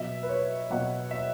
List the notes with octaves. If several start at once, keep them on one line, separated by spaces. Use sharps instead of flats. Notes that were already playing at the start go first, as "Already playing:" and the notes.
Already playing: B2 F#3 E5
B4
C#5
B2 F#3 F#5
E5